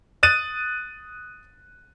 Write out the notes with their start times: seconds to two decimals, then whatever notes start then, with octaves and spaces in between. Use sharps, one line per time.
0.23 D#6 F#6 A6 D#7